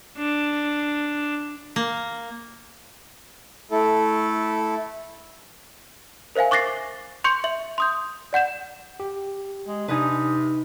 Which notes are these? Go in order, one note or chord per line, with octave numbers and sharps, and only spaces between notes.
D4
A#3
A3 E4 A4
A#4 C5 E5 F5 G#5
C#6 D6 F#6 A6 A#6 C7
C6 C#6 G6 C#7
E5 F#7
C6 D#6 G6
D5 F#5 G6 E7
G4
G#3
C3 D4 D#4 B4 G#5